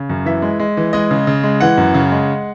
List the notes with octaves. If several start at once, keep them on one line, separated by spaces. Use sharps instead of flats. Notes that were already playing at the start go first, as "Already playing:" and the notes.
Already playing: C#3
F#2
E3 E5
G#3
G#3
E3
G#3 D#5
C#3
C#3
G#3
E3 F#5
F#2
C#3
G#3